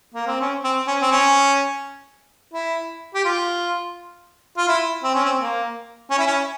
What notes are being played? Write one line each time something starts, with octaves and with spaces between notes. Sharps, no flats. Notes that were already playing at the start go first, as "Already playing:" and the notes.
A#3
C4
C#4
C4
C#4
C4
C#4
E4
G4
F4
F4
E4
C4
C#4
C4
A#3
C#4
E4
C#4